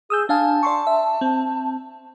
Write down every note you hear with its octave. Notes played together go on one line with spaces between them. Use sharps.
G#4 D#6 E6 G6
D4 F5 G#5 A5
D5 C6 C#6
E5
C4